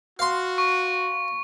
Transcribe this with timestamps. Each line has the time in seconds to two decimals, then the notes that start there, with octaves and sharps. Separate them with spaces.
0.19 F#4 F5 C6
0.58 C#6